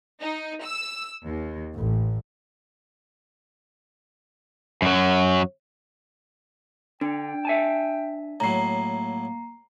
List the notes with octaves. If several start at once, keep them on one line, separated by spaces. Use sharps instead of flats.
D#4
E6
D#2
A1
F#2 F#3
D3 D4 G5
E5 G#5 A5
A2 F#3 A#3 A#5 C7